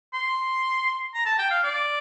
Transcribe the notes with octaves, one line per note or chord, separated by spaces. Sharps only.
C6
A#5
A5
G5
F5
D5